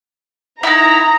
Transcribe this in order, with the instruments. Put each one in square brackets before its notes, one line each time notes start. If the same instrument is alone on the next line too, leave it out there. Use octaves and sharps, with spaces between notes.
[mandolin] D#4 E4 [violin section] A#5